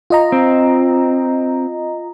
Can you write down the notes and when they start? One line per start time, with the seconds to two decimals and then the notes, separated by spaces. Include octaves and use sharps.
0.10 F4 D#5 A#5
0.32 C4